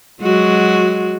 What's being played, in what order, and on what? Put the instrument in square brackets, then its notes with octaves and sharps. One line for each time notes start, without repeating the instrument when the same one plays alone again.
[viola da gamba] F#3 G#3 F#4